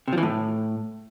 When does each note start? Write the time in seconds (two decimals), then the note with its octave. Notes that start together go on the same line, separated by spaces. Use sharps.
0.08 C3
0.13 F3
0.18 E3
0.23 A2